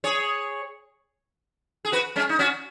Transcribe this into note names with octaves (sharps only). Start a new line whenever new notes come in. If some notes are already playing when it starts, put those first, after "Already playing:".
G#4 C#5
G#4
F#4 B4
G#3 C#4
D#4
C#4 F#4